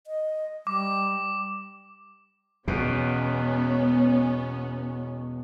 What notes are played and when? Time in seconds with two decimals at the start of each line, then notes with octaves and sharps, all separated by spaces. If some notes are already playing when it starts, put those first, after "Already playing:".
0.07 D#5
0.67 G3 D6
2.68 E2 B2 B3 C#4